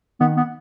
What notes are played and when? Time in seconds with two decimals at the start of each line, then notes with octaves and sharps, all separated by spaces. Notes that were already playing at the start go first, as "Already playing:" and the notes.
0.20 D#3 B3
0.37 B3